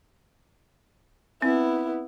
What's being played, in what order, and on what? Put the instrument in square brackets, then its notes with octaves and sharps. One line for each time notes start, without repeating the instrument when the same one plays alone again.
[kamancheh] B3 E4 [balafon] C4